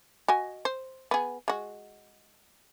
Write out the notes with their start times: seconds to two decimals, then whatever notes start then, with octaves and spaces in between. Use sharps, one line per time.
0.28 F#4 D#5 G#5
0.65 C5
1.11 B3 G#4
1.48 G#3 F#4